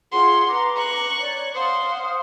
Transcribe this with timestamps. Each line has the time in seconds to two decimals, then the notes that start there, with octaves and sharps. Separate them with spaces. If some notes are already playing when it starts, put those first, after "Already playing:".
0.12 F4 G#4 F#5 C6
0.47 B4 A#5 D6
0.77 C#6 F#6
1.19 C#5 D5
1.55 C5 F5 F#5 D#6